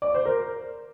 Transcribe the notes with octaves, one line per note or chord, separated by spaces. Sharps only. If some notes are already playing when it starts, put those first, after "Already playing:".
D5
C5
A#4